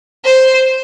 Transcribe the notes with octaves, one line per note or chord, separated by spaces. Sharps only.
C5